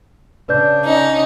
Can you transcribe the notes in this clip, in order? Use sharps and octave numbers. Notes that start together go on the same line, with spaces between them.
C#3 D4 B4 D5 G6
C#4 D#4